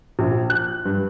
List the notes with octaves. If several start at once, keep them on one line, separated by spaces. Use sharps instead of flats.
A#1
F#6
G2